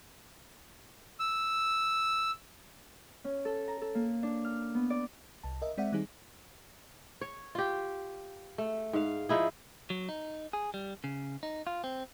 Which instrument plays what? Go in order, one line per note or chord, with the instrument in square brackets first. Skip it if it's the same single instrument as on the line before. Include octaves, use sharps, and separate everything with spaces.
[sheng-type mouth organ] E6
[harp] C#4
A4
A#5
A4
A#3
D4
F6
B3
D5
[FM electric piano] C2 A5
A#4 D#5 E5
G#3 C4 D5 E5 F#5
D#3 G3 C4 D#4 G#4
[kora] C#5
F4 G4
A3
G#2 F5
F3 D#4 E4 G#4
[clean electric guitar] F#3
D#4
G#4
G3
C#3
D#4
F4
C4